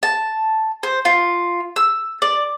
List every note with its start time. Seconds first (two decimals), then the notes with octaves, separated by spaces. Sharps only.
0.03 A5
0.83 C5
1.05 F4
1.76 E6
2.22 D5